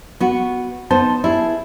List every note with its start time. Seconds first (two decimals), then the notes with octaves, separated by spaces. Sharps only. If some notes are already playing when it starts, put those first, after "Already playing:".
0.20 B3 F#4
0.91 B3 D#4 C5 A5
1.24 E4 G#4